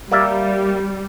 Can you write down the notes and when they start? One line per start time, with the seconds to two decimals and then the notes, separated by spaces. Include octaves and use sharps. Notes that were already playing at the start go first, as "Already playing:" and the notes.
0.12 G3 A#3 D5 E5